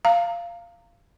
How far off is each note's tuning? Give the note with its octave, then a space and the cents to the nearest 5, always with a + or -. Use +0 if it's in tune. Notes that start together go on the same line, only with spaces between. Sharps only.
F5 -15 A#5 -25